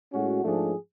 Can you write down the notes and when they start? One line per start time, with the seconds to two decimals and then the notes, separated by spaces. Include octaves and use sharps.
0.13 A2 G#3 C#4 F#4
0.43 G#2 F3 A3 D4 G#4